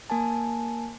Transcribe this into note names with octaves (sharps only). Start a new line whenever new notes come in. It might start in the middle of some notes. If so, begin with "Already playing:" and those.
A#3 A#4 G#5 A5